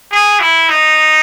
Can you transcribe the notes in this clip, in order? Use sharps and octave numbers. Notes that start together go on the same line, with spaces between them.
G#4
E4
D#4